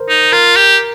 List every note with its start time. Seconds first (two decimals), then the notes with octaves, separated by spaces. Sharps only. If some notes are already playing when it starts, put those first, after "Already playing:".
Already playing: A#4 C5
0.09 D#4
0.32 F4 A#4
0.56 G4